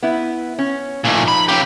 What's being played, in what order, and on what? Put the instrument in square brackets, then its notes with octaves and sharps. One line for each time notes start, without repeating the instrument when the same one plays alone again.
[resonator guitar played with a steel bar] B3 E4
C#4
[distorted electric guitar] A#2 A3 [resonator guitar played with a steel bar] F3 D#4
[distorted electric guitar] B5
C#3 G4